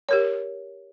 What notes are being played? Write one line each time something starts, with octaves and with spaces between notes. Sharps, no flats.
G4 A#4 C#5